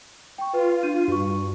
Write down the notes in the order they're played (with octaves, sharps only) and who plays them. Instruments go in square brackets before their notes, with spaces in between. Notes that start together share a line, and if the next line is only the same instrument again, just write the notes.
[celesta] G5 C#6
[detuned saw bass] F4 [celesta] B4
[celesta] D4 D#7
[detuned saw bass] G2 [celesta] F#4 C#6